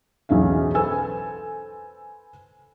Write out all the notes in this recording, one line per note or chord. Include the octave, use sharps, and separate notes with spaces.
B1 E2 C#4 E5 F5
A4 B4 C5 G#5 E6